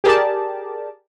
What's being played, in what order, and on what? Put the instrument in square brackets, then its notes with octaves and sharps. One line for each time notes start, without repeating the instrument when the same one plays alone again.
[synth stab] G4 G#4 A#4 D5 A5